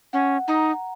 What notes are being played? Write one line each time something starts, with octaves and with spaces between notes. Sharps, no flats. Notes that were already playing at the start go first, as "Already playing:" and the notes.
C#4 F#5
D#4 A#5